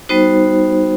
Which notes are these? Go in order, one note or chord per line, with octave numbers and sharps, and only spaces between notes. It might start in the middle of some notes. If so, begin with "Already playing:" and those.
G3 B3 D#4 F#4 C5